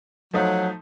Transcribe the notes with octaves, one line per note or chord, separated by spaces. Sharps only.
F3 F#3 A3 D#4